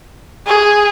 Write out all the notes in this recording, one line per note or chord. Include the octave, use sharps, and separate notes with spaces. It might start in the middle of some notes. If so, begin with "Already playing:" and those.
G#4